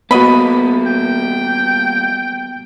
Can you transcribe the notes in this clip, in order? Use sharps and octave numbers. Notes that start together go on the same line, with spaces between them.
G3 A#3 B3 F#4 D#5 B5
G5